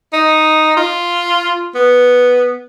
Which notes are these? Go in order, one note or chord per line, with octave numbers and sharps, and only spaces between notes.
D#4
F4
B3